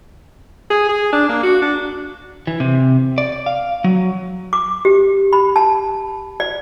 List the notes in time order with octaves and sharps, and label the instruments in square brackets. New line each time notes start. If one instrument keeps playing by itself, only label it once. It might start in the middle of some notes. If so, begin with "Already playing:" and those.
[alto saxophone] G#4
G#4
D4
A#3
F#4
D4
[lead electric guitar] E3
C3
D5
F5
F#3
[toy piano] D6
G4
B5
A5
D5